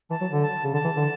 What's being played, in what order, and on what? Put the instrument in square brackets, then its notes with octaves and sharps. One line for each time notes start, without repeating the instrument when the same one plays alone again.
[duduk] E3 [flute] A5
[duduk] F#3
D3
[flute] A5
[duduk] C#3
[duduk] D3 [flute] A5
[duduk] E3
D3